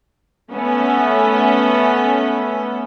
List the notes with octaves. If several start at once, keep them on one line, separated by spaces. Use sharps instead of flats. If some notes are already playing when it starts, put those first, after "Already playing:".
A3 B3 C#4 E5